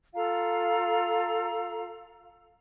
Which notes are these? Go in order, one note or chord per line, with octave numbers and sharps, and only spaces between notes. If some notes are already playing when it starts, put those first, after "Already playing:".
F4 A4 F5 A#5